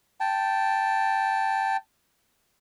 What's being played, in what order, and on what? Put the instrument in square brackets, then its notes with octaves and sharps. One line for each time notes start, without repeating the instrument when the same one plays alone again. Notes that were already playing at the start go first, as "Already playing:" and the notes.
[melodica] G5 A5